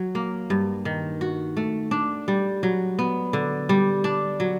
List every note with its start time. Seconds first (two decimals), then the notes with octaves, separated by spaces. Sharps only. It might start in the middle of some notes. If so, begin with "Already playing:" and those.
Already playing: F#3
0.15 A#3
0.50 G2
0.85 D#3
1.21 F#4
1.57 A3
1.91 D4
2.28 G3
2.63 F#3
2.99 B3
3.33 D3
3.69 G3
4.04 D4
4.40 F#3